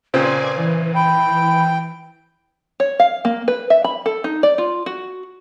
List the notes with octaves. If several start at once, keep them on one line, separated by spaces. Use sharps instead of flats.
A#2 C#3 C4 B4 D5 G#5
E3
G5 B5
C#5
F5
A#3
B4
E5
B5
A4
D#4
D5
F4
F#4